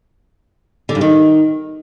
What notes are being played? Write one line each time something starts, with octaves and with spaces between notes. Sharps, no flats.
D3
G2
D#3